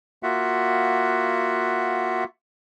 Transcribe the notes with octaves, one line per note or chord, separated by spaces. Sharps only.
A#3 F4 F#4 E5 F#5